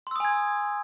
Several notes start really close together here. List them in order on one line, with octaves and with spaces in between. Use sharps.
C6 E6 D#6 G#5 G#6